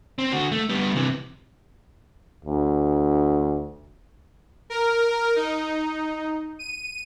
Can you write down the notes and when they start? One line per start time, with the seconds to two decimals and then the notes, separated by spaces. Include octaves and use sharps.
0.18 C4
0.33 D3 F#4
0.52 A3
0.69 G3 B3
0.96 C3 E3
2.45 D2
4.70 A#4
5.36 D#4
6.59 D#7